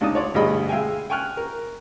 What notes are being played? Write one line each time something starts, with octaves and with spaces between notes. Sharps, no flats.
C#2 D4 D#4 A5 D#6
C#5 D5 C6
D2 G2 B2 G#4 D#5 B5
G#3 E5 F5 G5 G#5
G5 G#5 C#6 F6 F#6
A#4